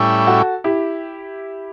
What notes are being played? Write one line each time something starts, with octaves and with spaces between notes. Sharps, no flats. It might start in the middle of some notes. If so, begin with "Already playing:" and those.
Already playing: A2 G3 C#4 E4
F#4 A4
E4 G4